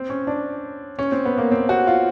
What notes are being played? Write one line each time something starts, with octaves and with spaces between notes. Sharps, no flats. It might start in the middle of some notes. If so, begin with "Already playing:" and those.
Already playing: C4
C#4
D4
C#4
C4
B3
A#3
C4
F#4
F4